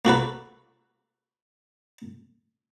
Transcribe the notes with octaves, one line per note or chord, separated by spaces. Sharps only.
A#3 F#4 A4 B4